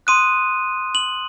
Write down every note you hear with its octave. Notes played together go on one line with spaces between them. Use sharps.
C6 D#6 F#6 D#7
F#7